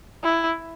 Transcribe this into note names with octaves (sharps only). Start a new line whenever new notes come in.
E4